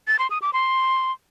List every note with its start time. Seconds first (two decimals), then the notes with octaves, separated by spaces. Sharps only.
0.07 A6
0.19 C6
0.30 D#6
0.42 D6
0.53 C6